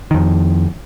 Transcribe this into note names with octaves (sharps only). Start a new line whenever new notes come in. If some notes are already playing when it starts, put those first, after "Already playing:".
F2 D#3